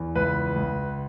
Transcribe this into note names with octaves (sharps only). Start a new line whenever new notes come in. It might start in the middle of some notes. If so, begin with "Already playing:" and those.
Already playing: E2
C#2 B4
C#2